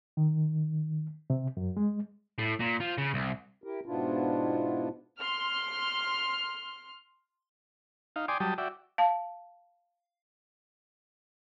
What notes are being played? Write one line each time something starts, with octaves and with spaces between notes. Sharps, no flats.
D#3
C3
F#2
G#3
A2
A#2
F3
C#3
C2
E4 G4 A#4
G#2 B2 B3 D4 E4 F4
C6 F6
D#4 F5
D5 G5 G#5 C6 D6 D#6
F#3 G3 G5 A5 D#6
F#4 D5 E5 G5
F5 A5